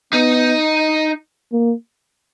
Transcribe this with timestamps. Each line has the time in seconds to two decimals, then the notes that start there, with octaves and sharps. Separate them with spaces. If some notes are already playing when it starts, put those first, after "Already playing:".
0.13 B3 D#4
1.52 A#3